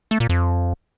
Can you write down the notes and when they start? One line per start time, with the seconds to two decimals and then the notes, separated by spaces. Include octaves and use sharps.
0.11 A3
0.20 A#2
0.29 F2